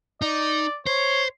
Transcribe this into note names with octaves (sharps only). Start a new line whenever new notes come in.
D#4 D5
C5 C#5